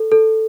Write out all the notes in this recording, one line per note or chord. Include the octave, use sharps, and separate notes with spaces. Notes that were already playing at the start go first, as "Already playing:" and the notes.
Already playing: A4
A4